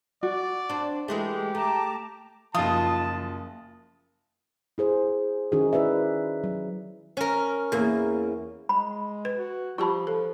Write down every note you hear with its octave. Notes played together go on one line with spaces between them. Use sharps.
F#4 D5
C4 D4
E3 G#3 A3 G4
A3 A5 A#5 D6
F#1 F3 D#4 F4 A5 D#6
E4 G#4 C5
D#3 C#4 D#4 E4 F#4 G#4
E4 B4 D5 E5
F#3
C#4 A#4
E2 A#3
G#3 B5
B4
F#4
F3 F4 G4 A5 B5 C#6
F3 A4